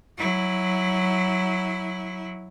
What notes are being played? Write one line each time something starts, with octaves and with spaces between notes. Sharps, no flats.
F#3 E4